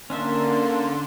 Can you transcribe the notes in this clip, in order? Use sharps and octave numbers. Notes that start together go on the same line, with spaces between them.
D3 A#3 C#4 D4 E5 C6